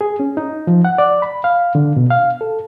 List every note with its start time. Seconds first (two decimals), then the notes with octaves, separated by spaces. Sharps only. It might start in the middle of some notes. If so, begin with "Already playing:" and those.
0.01 G#4
0.20 C#4
0.37 D#4
0.67 F3
0.85 F#5
0.98 D5
1.22 B5
1.44 F5
1.75 D3
1.96 B2
2.10 F5
2.41 A4